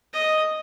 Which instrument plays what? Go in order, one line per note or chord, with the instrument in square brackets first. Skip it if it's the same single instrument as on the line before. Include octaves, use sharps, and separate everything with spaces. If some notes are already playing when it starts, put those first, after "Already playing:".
[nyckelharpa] D#5